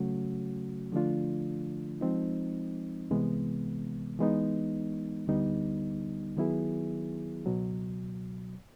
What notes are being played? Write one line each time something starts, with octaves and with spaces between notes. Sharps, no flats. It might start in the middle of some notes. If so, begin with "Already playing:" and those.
Already playing: C#3 F#3 A3 C#4 F#4
D3 F3 A3 D4 F4
F3 G#3 C4 D#4
C2 C3 E3 G#3 B3
E3 G#3 B3 D#4
D2 D3 G3 B3 D#4
D#3 F#3 B3 E4 G#4
C#2 B2 F#3